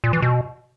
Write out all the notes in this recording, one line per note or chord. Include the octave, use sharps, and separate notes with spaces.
A#2
E3
B2